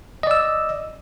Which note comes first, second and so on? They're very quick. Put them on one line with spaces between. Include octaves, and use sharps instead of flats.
D#5 D5 E6